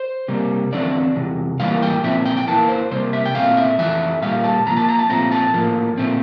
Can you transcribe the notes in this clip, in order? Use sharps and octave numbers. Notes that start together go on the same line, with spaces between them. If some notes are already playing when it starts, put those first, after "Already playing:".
Already playing: C5
C3 G3 A#3
E2 D3 F3 A3 C4 D5
E2 C3
A2 E3 G3 A#3 F5
G5
A#2 F3 C4 E5
G5
G5
E2 E3 A#3 A5
C5
C3 G3 A#3 C5
E5
G5
A#2 A3 C4 F5
E5
F2 E3 A3 E5
A#2 G3 F5
A5
A#2 F3 A#3 A#5
A5
A#5
A5
A#2 F3 A3 C4 A#5
A5
A2 F3 A#3
A#2 A3 C4